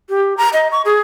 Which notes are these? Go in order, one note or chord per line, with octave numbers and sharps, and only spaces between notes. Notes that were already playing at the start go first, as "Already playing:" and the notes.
G4
A#5
D#5
C#6
G#4